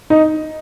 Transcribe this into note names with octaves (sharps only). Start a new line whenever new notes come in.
D#4